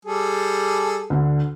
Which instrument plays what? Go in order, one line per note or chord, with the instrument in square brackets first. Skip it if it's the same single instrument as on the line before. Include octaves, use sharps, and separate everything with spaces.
[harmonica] G3 G#4 A4
[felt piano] D2 D3